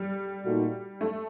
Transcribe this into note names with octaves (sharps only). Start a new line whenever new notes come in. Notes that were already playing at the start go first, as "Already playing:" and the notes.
Already playing: G3
A#2 A3 D#4 F#4
A3